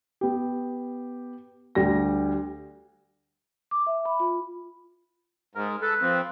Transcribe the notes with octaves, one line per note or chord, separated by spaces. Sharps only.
B3 G4
D2 G3 A#6
D6
E5
B5
F4
G#2 A#4
A4 B4
F3 C4